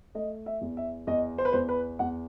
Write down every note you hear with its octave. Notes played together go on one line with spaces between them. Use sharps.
A3 D#5
E5
E2
E5
E2 D#5
C5
B4
E2 C5
B4
E2 F#5